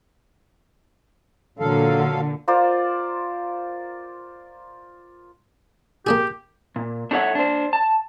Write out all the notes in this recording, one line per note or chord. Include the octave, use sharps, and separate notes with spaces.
A#2 D3 F#3 A4 F5
F4 A#4 C5 D5
A#3 D4 G4 G#4
A#2
D4 D#4 A4 C#5 E5 F#5
D4 C5
A5